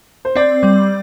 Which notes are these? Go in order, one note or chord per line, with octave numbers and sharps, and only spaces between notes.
C5
C4 D5
G3